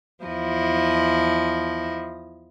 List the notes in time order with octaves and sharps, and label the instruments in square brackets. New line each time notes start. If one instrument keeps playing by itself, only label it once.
[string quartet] E2 F3 E4 D#5